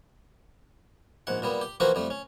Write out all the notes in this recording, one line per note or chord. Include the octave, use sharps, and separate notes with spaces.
A#1 G#2 F#5
A#2 G3 B3
G4
E3 F3 A#3 F#4 B4 C5
F2 G3 A3
C#4